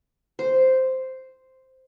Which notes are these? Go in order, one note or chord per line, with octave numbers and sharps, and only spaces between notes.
C5